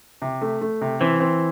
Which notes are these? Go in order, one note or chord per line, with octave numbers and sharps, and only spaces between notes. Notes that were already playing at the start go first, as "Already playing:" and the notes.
C3
A3
A3
C3
E3 C4
C4